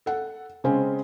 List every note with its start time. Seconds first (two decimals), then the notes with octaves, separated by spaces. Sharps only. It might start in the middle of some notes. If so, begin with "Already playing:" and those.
0.06 A4 F#5
0.64 C#3 G#3 C4 C#4